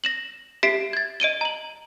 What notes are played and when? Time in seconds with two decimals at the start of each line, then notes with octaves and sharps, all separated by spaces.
0.04 A#6 E7 F#7
0.63 G4 E5 B6 C7 D7 E7
0.93 G#6 A6
1.20 D#5 D7 D#7 G7
1.41 A#5 F#7